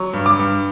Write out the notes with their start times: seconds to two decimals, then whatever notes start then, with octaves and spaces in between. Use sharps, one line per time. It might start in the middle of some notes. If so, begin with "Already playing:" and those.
Already playing: F#3 C#6
0.13 G2
0.26 D6
0.39 G2